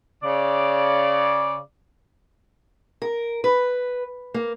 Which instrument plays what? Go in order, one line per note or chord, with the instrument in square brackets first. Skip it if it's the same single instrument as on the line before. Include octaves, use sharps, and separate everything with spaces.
[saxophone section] C#3 D5
[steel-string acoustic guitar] A#4
B4
A#3